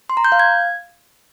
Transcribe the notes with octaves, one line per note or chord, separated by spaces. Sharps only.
C6
A#5
G6
F5
G#6